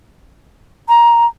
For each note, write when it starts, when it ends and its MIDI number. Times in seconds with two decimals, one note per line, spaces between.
0.89 1.26 82